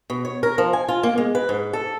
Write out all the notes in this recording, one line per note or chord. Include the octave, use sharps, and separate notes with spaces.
B2
C#5
A#4
F3
G#5
F4
A#3
G#3
B4
G#2
A4